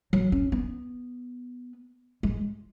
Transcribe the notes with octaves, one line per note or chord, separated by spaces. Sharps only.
F#3
C#4
B3
G#3